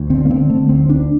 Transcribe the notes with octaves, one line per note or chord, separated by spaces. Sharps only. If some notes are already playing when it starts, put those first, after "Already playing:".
Already playing: D2
D3 C4
A#3
D3 C4
D3 A3
D2 C4
D2 D4